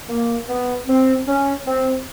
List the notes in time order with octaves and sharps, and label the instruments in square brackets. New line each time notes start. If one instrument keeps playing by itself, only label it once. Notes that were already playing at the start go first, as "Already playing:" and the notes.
[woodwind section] A#3
B3
C4
C#4
C4